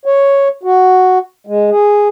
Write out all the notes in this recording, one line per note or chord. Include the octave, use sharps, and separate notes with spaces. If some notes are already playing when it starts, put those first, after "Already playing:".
C#5
F#4
G#3
G#4